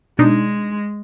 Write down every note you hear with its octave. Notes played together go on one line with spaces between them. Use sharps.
B2 G#3 D4 D#4